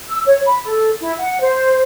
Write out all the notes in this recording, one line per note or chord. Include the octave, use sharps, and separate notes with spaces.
E6
C#5
B5
A4
E4
F#5
C5